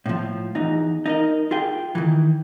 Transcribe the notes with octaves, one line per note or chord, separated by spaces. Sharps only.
A2 F3
E2 B3 D#4
D#4 A#4 D#5
F4 G#4 G5
D#3 E3